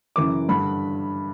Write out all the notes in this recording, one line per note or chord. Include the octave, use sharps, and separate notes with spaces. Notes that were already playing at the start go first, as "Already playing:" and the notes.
F#2 C#3 E3 D6
G2 D3 B5